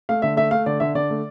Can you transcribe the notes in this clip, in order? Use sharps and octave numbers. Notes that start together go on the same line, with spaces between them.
A3 F5
D3 E5
A3 E5
A3 F5
D3 D5
D3 E5
D3 D5
A3